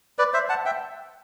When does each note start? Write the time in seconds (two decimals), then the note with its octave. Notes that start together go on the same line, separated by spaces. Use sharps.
0.19 B4 D5
0.34 C5 E5
0.49 F#5 A5
0.66 E5 G5